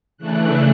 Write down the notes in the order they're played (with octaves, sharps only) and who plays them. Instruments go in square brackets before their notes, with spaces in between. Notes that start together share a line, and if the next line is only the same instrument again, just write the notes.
[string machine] C#3 E3 A3 D4 F#6